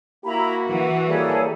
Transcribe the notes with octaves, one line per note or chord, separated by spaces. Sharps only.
A#3 E4 F#4 A#5 B5
E3 F#5
G3 A#3 G#4 A4 C#5